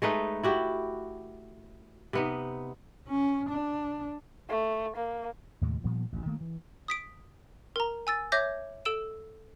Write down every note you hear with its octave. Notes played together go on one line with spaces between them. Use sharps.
G#3 A3 D#4 B4
E4 F#4 G4
C3 B3 D#4
C#4
D4
A3
A#3
D#2 A2 C3 G#3
A#2 F3 G3 B3
A1 D2
D#3 A3 A#3
E3
D#6 B6 D7
A#4 A#5
G#5 E6 A6
C#5 E5 D6 G6 G#6 A#6
A4 E6 D7 E7